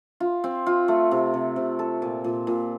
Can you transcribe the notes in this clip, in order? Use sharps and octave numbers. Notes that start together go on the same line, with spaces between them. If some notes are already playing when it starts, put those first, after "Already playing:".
F4
C4
F4
A3
C3
C3
C3
A4
A#2
A#2
A#2